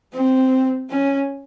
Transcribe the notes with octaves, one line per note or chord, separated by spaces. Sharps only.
C4
C#4